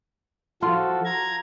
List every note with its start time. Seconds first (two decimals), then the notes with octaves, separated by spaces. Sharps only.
0.62 F3 F4 F#4 A4
1.05 A#5 G#6